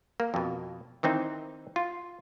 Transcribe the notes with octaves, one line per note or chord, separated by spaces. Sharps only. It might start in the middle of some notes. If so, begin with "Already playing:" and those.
A#3
F2 B2
D#3 E3 C4 D#4
F4